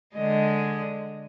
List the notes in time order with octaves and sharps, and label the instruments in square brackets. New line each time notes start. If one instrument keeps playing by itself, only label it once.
[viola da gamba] D3 G#3 D#5